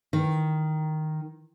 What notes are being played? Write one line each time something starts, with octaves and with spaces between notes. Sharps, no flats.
D#3